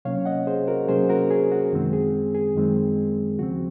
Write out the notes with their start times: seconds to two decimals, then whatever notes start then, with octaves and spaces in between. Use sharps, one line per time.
0.05 C3 F#3 A#3 C#4 C#5 F5
0.25 D#5 F#5
0.47 G#4 C5
0.68 F#4 A#4
0.88 C3 F#3 A#3 C#4 G#4 C5
1.09 F#4 A#4
1.30 G#4
1.52 F#4
1.72 F#2 D#3 G#3 C4
1.93 G#4
2.35 G#4
2.55 F#2 D#3 G#3 C4
3.39 D#2 C#3 F3 C4 F#4